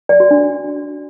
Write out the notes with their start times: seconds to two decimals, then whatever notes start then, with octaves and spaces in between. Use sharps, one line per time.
0.09 D5
0.20 F#4
0.31 D4